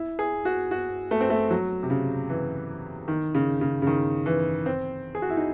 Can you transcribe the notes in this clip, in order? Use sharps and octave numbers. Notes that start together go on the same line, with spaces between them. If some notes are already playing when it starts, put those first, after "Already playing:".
Already playing: E4
G#4
F#4
F#4
A3
C4
A3
F#3
C3
C#3
E3
D#3
C#3
C#3
C#3
D#3
E3
C4
G#4
F#4
E4
D#4